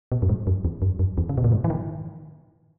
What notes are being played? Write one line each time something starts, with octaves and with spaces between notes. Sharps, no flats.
B2
F#2
G#2
F#2
E2
F#2
F#2
E2
C#3
B2
A#2
G#2
E3
D#3